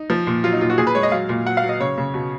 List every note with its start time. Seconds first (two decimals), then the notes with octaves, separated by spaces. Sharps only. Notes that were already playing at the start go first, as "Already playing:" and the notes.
Already playing: D#4
0.10 F3
0.27 A#2
0.44 F#3 F4
0.52 D#4
0.61 A#2 F4
0.70 F#4
0.78 A#2 G#4
0.87 B4
0.95 G#3 C#5
1.03 D#5
1.12 F#3 F5
1.29 A#2
1.46 F#3 F#5
1.57 F5
1.63 F#3
1.69 D#5
1.80 C#3 C#5
1.98 C#3
2.14 B2